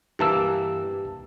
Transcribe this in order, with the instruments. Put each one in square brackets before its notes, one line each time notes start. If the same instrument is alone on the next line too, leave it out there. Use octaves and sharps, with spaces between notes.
[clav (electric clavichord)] G2 E3 A#3 [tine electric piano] G4 A5 E6